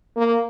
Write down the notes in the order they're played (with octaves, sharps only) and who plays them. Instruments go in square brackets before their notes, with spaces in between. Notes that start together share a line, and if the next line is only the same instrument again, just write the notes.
[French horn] A#3